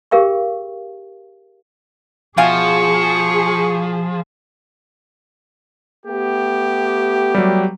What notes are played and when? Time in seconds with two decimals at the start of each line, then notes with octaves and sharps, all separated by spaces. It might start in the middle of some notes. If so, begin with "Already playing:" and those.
0.11 G4 G#4 A#4 F5 G5 C#6
2.37 B2 F3 G#4 F5 G#5 C#6
6.06 A3 B3 G4
7.35 F#3 G3